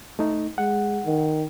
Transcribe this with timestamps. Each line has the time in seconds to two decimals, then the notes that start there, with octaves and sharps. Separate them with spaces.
0.19 A3 D#4
0.58 G#3 F#5
1.05 D#3